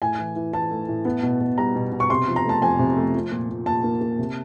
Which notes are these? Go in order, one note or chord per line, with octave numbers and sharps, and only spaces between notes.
A2 G#5
E3
E3
E3 A5
A3
A2
B3
B2
B2
G3 A#5
B2
B2
C#6
C3 C6
F3
A#5
A3 A5
F2 G#5
C3
A3
F3
A#2
A#2
A#2 A5
A#3
A#3
C3